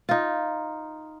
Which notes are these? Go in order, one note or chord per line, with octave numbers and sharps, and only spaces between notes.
D#4 F4